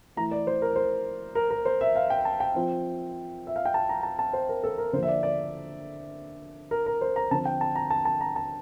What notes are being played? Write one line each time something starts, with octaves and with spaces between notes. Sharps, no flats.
E3 A3 E4 A#5
D5
C5
A#4
C5
A#4
A#4
C5
E5
F5
G5
A5
G5
F3 C4 F4
E5
F5
G5
A5
A#5
A5
A5
C5
A#4
A4
A#4
D3 F3 A#3 C5
E5
D5
D5
A#4
A#4
C5
A#5
D3 F3 C4 A5
G5
A5
A#5
A5
A5
A#5
A5